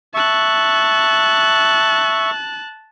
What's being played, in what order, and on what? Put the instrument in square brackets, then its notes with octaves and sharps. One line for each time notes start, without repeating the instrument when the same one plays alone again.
[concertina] E5 C#6 [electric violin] A5 F#6